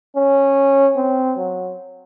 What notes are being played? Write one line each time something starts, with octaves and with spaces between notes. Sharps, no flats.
C#4
C4
F#3